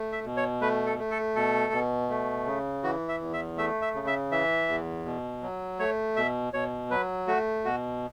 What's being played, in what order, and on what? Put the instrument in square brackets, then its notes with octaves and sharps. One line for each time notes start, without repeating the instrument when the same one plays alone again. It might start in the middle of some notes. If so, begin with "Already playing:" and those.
Already playing: [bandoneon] A3
E5
B2
C#5
A3 B4
A4
A3
A4
B2 A4
B2
A3
C#3
E3 F#4
E5
E2
E5
A3 E5
E5
C#3
E5
E3 E5
E2
B2
F#3
A3 C#5
B2 E5
B2 C#5
F#3 B4
A3 F#4
B2 F#4